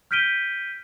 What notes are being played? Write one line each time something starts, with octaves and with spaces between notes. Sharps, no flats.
F6 G6 B6 D7 D#7 G7